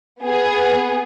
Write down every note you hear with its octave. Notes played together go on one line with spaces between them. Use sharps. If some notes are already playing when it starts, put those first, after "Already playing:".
B3 G#4